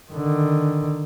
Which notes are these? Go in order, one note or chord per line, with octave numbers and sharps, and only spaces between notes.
D3 D#3